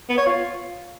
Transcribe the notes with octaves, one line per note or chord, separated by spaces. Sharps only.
B3
C#5
F4